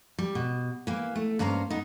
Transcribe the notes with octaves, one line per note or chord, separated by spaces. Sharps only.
G3
B2
E3 A#3
A3
G2 A#3 C#4 C5 A#5
B3 D#4